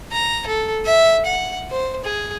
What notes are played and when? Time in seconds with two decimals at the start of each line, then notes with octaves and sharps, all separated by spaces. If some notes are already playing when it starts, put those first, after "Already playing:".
0.12 A#5
0.47 A4
0.85 E5
1.26 F#5
1.71 C5
2.05 G#4